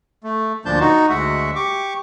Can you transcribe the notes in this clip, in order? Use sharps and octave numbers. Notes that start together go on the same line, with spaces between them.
A3
D2 A#2 F3 D4 A5 G6
D#4 F#4
D2 G#3 F#4 E5 F#5
G4 C#6 D6